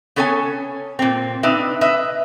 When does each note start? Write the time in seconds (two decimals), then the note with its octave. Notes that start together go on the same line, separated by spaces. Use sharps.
0.16 B3 C#4 A4 C#5 F5 G#5
0.99 A#2 C4
1.43 C4 D4 D#4 B4 E5
1.81 B4 D#5 E5